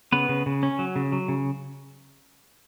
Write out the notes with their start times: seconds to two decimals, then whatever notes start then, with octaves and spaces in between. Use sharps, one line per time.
0.12 C#3 B3 B4
0.29 C#3
0.46 C#3
0.63 C#4
0.79 F#3
0.96 C#3
1.12 F#3
1.28 C#3